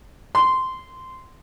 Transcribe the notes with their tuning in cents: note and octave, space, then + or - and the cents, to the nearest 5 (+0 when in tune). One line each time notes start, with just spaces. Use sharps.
C6 -10